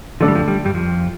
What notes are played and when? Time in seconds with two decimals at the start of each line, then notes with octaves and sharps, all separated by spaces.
0.20 D3 F3 A3 D4 A4 D5
0.28 G3
0.35 F2 F3
0.48 G3
0.65 G2 G3
0.74 F2 F3